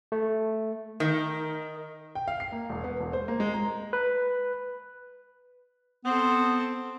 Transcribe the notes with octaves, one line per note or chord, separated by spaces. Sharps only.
A3
D#3
G5
F5
C7
A#3
E1
B3
E1
C5
A#3
G#3
A#5
B4
B3 C4 A4